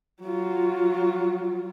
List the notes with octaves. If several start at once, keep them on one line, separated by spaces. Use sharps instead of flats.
F#3 F4